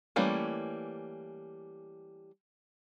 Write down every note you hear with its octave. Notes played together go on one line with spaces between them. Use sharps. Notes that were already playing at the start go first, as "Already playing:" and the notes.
E3 G3 A3 A#3 C#4